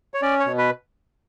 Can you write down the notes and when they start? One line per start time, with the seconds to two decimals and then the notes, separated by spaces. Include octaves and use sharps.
0.14 C#5
0.22 C#4 D5
0.40 C#5
0.46 B2
0.58 B4